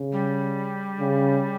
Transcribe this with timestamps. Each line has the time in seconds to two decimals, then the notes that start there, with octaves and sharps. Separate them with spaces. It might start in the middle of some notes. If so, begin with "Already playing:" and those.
Already playing: C#3
0.12 G3
1.00 C#3